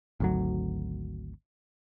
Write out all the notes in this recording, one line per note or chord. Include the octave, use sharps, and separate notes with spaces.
G#1 D2 F#3